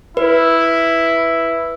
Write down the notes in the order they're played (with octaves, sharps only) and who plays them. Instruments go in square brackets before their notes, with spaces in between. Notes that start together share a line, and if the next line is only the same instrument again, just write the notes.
[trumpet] E4 [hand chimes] B4